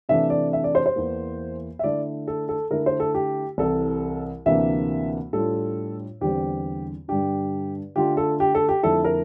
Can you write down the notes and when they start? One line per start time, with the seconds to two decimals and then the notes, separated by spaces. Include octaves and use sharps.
0.09 C3 E3 A3 D4 E5
0.30 D5
0.53 E5
0.64 D5
0.75 C5
0.86 C5
0.96 E2 E3 A#3
1.79 E5
1.84 D3 A3 E4 D5
2.28 A4
2.49 A4
2.71 D3 A3 E4 A#4
2.86 C5
3.00 A4
3.15 G4
3.58 C2 C3 E3 A4
4.46 D2 C3 E3 A#3 D4 E5
5.33 A2 G3 D4 F4 A4
6.21 E2 D3 G3 C4 G4
7.08 G2 D3 G3 D4 G4
7.96 D3 A3 D4 F4 G4
8.17 A4
8.40 G4
8.55 A4
8.69 G4
8.83 F2 D3 A3 E4 A4
9.04 A#4